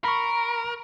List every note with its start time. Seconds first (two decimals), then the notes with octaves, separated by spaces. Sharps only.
0.04 A#4 B5 C#6